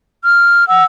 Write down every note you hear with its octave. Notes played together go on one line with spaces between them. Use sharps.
F6
F#5 E6